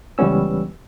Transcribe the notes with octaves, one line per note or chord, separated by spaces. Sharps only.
C#2 E3 G3 B3 C#4 E6